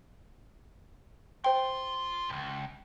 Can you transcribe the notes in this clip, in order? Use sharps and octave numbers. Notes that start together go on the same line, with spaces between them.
F4 C5 G5 C6
C#2 G2